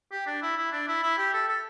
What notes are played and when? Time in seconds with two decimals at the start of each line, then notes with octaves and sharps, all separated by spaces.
0.12 G4
0.26 D4
0.42 E4
0.58 E4
0.72 D4
0.88 E4
1.03 E4
1.18 G4
1.33 A4
1.48 A4